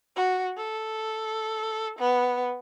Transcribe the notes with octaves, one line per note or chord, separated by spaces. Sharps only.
F#4
A4
B3